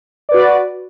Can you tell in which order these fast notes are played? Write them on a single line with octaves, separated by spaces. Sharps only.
D5 B4 F#4